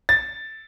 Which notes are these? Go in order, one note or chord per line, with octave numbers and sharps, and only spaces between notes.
A6